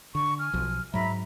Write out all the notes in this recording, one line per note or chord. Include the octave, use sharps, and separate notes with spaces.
D3 C#6
G#5 F6
B1 F3
G#2 F#3 E5 A#5 B5